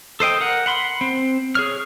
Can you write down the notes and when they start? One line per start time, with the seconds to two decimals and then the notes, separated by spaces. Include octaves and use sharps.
0.20 A4 C5 D#5 G5
0.41 A#4 F#5
0.66 F#5 B5 C6
1.01 C4
1.55 G#4 C#5 F6